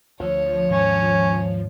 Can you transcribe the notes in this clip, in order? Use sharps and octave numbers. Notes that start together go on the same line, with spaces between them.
D2 F3 C#5
D#2 G#2 F#3 C#4